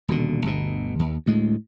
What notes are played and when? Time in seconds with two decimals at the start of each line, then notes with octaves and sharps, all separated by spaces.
0.08 D#1 B2 D3
0.45 G1 D2 B2
0.99 D#2
1.26 D2 A2 G#3